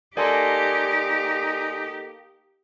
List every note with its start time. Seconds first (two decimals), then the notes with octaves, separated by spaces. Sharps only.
0.17 A#3 D#4 G4 A4 D5 G#5 C6